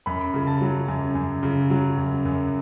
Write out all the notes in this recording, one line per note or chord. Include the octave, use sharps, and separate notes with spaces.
F#2 B5
C#3
A5
F#3
F#2
F#2
C#3
F#3
F#2
F#2